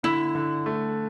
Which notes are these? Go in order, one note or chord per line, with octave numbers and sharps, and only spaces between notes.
D3 E4
D3
A3